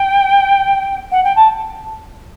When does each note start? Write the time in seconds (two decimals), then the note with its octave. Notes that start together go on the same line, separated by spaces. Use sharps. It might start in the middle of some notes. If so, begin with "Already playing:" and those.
Already playing: G5
1.11 F#5
1.24 G5
1.36 A5